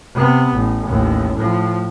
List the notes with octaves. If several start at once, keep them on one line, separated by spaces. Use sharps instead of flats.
C3 B3
A1
A1 D#2
A2 F3